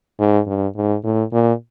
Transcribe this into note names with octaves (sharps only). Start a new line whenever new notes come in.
G#2
G2
G#2
A2
A#2